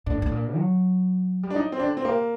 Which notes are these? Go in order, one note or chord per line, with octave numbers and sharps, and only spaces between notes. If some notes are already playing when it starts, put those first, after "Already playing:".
A2 D4
G2
A2
A#2
F#3
G3
D4
F#3 D#4
C4
D3 D4
C4
C3 A#3